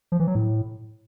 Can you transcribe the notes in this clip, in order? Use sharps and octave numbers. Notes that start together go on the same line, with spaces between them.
F3
E3
F#3
A2